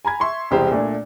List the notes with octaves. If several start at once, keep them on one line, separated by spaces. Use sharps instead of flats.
G#5 A#5 B5 G#6
E5 C6 C#6
E1 C2 G4 G#4 C5
A#2 A3 D4